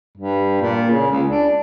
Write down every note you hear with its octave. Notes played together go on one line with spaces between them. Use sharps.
G2
A#2
C#3
C#2
D4